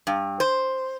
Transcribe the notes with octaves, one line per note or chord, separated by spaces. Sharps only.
G2
C5